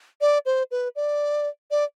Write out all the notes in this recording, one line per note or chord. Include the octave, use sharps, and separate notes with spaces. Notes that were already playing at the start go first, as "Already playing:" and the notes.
D5
C5
B4
D5
D5